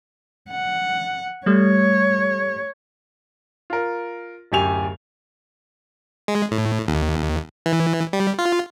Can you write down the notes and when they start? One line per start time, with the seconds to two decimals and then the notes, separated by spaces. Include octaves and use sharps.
0.50 F#5
1.46 G3 A3 C#5
3.70 F4 A#4
4.52 D1 F#2 G4 G#5 F7
6.28 G#3
6.51 A2
6.88 D#2
7.66 E3
8.13 G3
8.39 F4